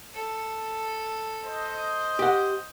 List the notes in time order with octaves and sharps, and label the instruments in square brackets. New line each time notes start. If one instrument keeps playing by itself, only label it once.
[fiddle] A4
[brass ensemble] C5 D#5
[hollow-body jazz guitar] G4 F#5